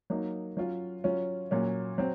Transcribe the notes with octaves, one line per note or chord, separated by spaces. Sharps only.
F#3 A#3 D#4
F#3 C#4 F4
F#3 C#4 F4
A#2 F#3 C#4
F#3 C4